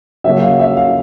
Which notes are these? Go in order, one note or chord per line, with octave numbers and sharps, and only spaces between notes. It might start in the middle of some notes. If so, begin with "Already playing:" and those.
C#3 F#3 A#3 C#4 E5
F5
E5
F5